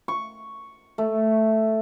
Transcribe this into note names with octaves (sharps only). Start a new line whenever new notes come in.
C#6
A3